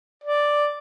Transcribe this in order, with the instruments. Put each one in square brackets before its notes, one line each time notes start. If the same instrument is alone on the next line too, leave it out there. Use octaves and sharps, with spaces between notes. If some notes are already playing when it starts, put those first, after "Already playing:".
[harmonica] D5